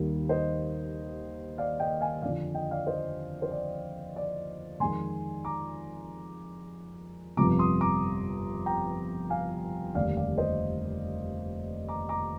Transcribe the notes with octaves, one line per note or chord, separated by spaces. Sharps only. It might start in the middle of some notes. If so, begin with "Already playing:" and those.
Already playing: D#2 D#3 G3
C5 D#5
D5 F5
D#5 G5
F5 G#5
F2 D3 F3 D5 F5
D#5 G5
D5 F5
C5 D#5
C5
D5
D5
F2 D#3 G#3 G#5 C6
A#5 D6
G1 F2 C3 F3 A#5 D6
C6 D#6
A#5 D6
G5 A#5
F5 G#5
F1 D#2 D3 G3 D5 F5
D5 F5
C5 D#5
A#5 D6
A#5 D6